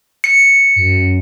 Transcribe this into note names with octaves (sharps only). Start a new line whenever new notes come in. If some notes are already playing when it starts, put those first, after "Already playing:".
C#7
F#2